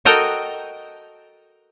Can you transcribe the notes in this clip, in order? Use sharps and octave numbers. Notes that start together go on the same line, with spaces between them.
F#4 A4 A#4 D#5 G5